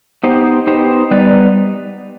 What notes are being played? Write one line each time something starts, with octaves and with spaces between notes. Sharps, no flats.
B3 D#4 G4 C5
B3 D#4 G4 C5
G3 B3 D#4 B4 D5